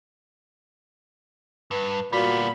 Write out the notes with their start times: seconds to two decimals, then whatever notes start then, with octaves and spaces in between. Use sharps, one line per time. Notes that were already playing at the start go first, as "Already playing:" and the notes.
1.71 G2 B4
2.13 A#2 G3 B3 F#4 B5